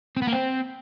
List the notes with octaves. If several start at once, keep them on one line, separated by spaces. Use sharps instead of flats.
C4
B3
A#3
C4